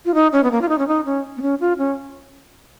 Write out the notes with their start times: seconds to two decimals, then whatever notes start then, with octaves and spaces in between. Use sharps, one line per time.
0.05 F4
0.15 D#4
0.33 C#4
0.43 B3
0.51 A#3
0.62 F4
0.69 D#4
0.78 C#4
0.88 D#4
1.06 C#4
1.37 B3
1.42 C#4
1.60 F4
1.78 C#4